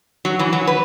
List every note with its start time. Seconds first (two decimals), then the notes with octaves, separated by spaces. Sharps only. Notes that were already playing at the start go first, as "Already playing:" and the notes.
0.25 F#3
0.39 E3
0.53 F#3
0.67 B4